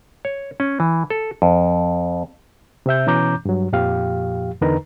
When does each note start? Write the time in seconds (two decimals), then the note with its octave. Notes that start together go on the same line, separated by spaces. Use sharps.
0.25 C#5
0.60 C#4
0.80 E3
1.10 A4
1.42 F2
2.86 C3 C4 E5 G6
3.07 B2 E3 C#4 A#5 D6 G6
3.45 G2 F#3
3.73 F2 A#2 F3 G4 F5
4.61 E2 D3 D#4 A#4 B4 A#5